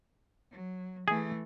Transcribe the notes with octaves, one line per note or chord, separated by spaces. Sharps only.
F#3
E3 A3 G#4